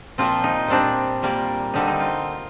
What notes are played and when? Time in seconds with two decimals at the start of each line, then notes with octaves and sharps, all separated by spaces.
0.18 A#2 F3 C4 F4
0.44 D#4
0.68 A#2 G3 C4 D4
1.22 A#2 G3 A#3
1.74 D3 G3 C4 D#4
1.87 D#4
2.00 F4